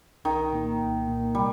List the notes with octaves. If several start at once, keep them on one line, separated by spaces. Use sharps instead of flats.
C2 D#3
A#2 A#3 D#4
C2
A#2 A#3 D#4
C3 G3